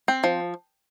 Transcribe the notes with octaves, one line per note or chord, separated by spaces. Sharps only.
C4
F3